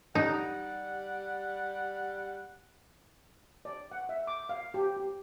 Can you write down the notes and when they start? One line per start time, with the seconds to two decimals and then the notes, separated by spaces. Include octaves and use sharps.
0.15 G3 D#4 F#5
3.65 D5
3.91 F#5
4.09 E5
4.27 D6
4.49 F5
4.74 G4
4.97 G4